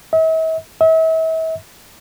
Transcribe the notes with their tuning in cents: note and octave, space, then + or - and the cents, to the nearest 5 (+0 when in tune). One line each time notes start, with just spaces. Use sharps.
E5 -45
E5 -40